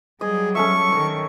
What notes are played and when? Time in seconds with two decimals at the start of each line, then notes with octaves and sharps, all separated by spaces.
0.21 F#3 G3 G#4 D#5
0.55 C#4 A4 E5 C#6
0.92 D#3 C#5